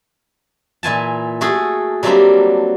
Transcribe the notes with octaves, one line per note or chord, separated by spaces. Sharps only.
A#2 E3 G#5 A5
A3 F#4 G#4 A4
F#3 G3 A3 A#3 C4 D4